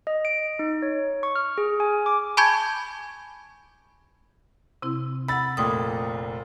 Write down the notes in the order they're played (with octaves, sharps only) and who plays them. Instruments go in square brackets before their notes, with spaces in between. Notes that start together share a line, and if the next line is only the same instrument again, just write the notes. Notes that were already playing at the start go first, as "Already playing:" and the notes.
[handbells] D#5
D7
D#4
C#5
C#6
F6
G#4
G#5
D6
[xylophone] G#5 A5 B5 C#6 G6 G#6
[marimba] C3 C4 E4
[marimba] F#5 E6 [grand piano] B5 A6
[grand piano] F1 A#2 [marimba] G5 D#6